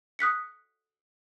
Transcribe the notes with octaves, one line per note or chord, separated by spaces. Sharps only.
D#6 F#6 B6 C#7